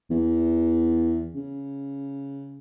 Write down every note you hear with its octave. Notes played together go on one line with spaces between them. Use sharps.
E2
C#3